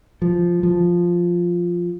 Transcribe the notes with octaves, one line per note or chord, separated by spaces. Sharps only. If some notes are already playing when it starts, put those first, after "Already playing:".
F3
F3